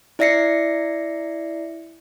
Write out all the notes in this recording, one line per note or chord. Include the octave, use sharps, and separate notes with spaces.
E4 D5 E5 A#6 C7 C#7